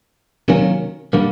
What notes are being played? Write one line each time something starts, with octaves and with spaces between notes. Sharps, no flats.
C3 D#3 F#3 A#3 C#4
D3 G3 A#3